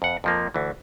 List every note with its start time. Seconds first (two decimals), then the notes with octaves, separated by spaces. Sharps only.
0.02 F2 F#5
0.24 F2 F3 A#3
0.54 D2 E3